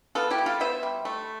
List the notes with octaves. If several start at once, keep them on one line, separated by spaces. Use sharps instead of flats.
B3 F4 A4
E4 G4
G3
F4 A4
B3 C5 E5
G3
A3